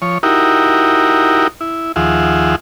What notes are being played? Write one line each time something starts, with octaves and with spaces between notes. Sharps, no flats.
F3 C#5
D#4 E4 F#4 G4 A#4
E4
D#2 F3 F4 G#4 E5 F#5